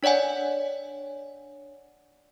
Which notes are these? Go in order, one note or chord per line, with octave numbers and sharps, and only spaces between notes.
D4 C#5 D5 F#5 G#5